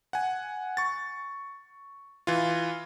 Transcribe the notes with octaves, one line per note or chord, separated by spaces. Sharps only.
F#5 G#5
C#6 A6
E3 F4